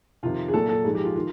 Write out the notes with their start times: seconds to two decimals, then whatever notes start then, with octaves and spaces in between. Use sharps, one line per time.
0.23 F2 C3 D#3 F4
0.48 G#4
0.54 A#2 F#3 A4
0.69 A4
0.84 G#2 F3 G#4
0.95 G4
1.05 F4
1.16 D#3 F4